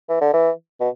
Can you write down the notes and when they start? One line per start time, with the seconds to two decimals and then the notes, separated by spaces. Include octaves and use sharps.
0.09 E3
0.21 D3
0.33 E3
0.80 B2